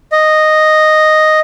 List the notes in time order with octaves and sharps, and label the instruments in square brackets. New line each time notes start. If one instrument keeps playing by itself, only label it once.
[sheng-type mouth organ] D#5